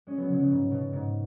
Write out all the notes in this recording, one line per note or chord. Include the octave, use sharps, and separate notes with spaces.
G#3 C#4
F#3 B3
C#3 F#3
C#3 F#3
G#2
B2
G#2